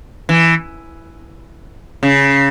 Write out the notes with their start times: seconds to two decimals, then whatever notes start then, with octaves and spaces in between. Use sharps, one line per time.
0.29 E3
2.03 C#3